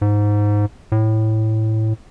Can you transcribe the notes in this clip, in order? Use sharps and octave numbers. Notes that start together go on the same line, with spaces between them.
G#2
A2